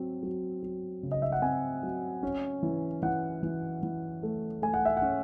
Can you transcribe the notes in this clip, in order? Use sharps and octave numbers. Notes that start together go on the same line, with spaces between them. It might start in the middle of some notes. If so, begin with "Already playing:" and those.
Already playing: F#3 C4
F#3
F#3
C#3
D#5
E5
F#5
C4 G#5
F#3
C#4
E3
E3 F#5
E3
E3
A3
A3 G#5
F#5
E5
F#5
C#4